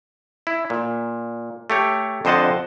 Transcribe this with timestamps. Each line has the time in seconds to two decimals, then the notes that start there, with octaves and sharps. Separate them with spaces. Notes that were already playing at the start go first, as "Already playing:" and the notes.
0.47 E4
0.70 A#2
1.70 A3 G4 C#5
2.25 F2 D3 C5 D#5 F#5 A5